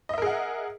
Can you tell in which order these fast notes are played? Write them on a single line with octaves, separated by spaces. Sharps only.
D#5 E5 A#4 G#4 F#5